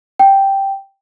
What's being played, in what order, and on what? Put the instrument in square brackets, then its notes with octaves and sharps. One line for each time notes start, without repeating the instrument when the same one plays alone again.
[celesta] G5